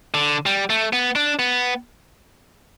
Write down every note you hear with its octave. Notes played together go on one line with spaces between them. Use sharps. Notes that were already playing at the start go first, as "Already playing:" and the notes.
D3
G3
A3
B3
D4
B3